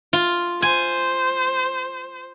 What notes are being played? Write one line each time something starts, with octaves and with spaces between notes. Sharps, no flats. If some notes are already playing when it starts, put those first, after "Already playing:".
F4
C5 G#5